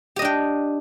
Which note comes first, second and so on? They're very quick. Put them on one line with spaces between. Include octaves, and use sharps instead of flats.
G4 D#5 D4 G5